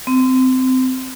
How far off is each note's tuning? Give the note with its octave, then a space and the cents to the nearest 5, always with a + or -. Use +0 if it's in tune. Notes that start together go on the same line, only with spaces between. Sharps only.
C4 -20